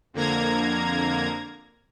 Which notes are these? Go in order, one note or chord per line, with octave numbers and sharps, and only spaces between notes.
F2 D3 A#3 A#5 G#6